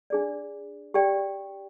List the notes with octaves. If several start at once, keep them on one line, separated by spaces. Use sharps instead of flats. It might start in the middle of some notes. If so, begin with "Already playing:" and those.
D4 G#4 D5
G4 D5 G5